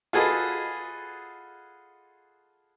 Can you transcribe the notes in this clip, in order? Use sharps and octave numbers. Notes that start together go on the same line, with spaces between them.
F4 F#4 G#4 A4 B4 D#5